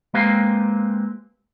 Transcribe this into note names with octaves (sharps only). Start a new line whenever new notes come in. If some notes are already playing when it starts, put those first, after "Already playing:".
G#3 A#3 C4 G4 B4 F5